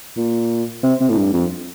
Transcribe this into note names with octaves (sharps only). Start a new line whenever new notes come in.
A#2
C3
C3
A2
G2
F2